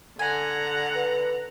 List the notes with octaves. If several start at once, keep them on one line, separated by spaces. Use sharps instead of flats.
D3 F#5 G#5 A#5
B4